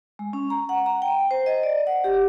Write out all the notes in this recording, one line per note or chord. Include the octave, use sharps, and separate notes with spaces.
G#3
C#4
A#5
F#5
A#5
G5
C5
D#5
D5
F#5
G4